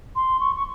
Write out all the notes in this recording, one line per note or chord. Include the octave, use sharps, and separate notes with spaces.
C6
C#6
C#6